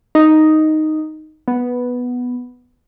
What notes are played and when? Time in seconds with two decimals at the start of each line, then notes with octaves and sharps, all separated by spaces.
0.15 D#4
1.48 B3